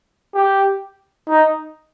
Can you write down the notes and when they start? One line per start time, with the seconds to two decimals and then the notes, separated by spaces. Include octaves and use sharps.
0.34 G4
1.28 D#4